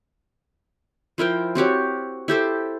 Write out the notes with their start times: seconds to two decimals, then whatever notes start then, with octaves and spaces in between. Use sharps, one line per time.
1.18 F3 E4 A#4 G5
1.55 C4 F#4 G4 C#5
2.28 E4 G4 A4 C5